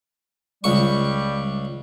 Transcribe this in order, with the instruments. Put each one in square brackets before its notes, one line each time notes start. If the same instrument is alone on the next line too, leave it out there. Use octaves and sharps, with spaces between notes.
[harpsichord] C#2 C#6 [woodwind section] G3